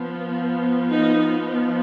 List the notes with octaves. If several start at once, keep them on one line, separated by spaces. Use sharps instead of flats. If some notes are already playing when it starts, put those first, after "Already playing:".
Already playing: F3 B3
D#4